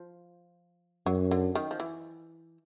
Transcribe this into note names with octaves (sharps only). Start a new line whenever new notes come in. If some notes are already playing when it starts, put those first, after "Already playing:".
Already playing: F3
F#2 F#3
D3
D#3
F3
E3